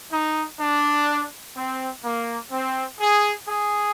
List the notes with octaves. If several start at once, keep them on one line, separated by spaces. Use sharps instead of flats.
D#4
D4
C4
A#3
C4
G#4
G#4